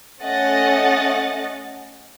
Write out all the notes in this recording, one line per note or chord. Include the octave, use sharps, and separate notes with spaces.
A3 C#4 D#5 F#5 A6